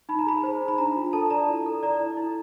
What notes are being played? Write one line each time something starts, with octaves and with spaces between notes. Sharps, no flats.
D#4 B5
A#5
G#4 B5
C5
D#4
B5
D4 A#5
F4
A4 A5
D5 A#5
E4
A4
D5 A#5
E4
E4